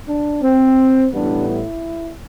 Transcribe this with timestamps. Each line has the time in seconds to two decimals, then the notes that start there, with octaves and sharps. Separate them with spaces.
0.09 D4
0.43 C4
1.13 A1 A2 G3 B3 D4
1.48 E4